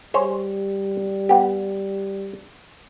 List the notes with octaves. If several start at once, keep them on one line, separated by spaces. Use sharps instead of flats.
G3 G#4 C5 C#5
B3 G4